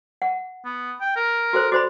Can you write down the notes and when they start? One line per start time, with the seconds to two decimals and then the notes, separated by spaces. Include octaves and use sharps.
0.22 F#5
0.65 B3
1.01 G5
1.16 A#4
1.53 F#4 A4 C5
1.72 F#4 C5 D5 B5